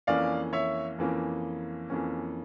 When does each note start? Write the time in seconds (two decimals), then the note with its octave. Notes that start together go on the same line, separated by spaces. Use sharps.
0.07 F2 E3 A#3 C#4 D5 F5
0.53 C#5 E5
0.98 F2 E3 A#3 C#4
1.90 F2 E3 A#3 C#4